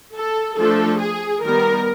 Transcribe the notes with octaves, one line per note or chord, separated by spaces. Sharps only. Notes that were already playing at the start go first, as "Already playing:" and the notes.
A4
F3 A3 D4 A4
G#4
D#3 G3 B3 A#4